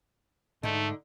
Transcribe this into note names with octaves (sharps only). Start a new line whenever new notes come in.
G#2 D3 A3 D#4